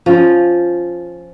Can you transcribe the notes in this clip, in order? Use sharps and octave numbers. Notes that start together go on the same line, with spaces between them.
F3 C#4